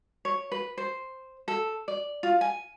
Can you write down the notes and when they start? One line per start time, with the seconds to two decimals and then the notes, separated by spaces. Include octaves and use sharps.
0.25 C#5
0.52 B4
0.77 C5
1.48 A4
1.88 D5
2.23 F4
2.41 G#5